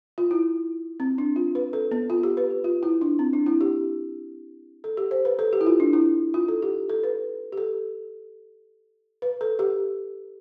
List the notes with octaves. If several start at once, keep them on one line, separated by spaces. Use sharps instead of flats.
F4
E4
C4
D4
F4
B4
A4
B3
F4
G4
B4
G4
F4
E4
D4
C4
D4
E4
G4
A4
G4
C5
B4
A4
G4
E4
F4
D4
E4
F4
A4
G4
A4
B4
G4
A4
B4
A4
G4